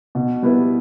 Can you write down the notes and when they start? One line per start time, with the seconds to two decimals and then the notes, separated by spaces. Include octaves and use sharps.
0.15 B2
0.42 G3 B3 E4 B4